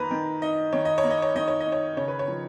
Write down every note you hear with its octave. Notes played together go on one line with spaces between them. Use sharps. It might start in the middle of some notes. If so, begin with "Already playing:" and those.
Already playing: D#3 A#3 B4 A#5
D#3
D#4 D#5
D#3 C#5
D#5
C#5
A#3
D#5
C#5
D#3 D#5
C#5
D#5
D#4
C#5
C#3 C#5
B4
C#5
F3